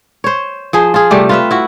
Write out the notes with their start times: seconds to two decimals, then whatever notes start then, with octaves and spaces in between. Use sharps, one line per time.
0.24 C5 C#5
0.73 F3 G#4 C5
0.94 F4 G#4
1.11 C3 G3 A3 G4
1.29 F4 B4 E5
1.51 E4 F#4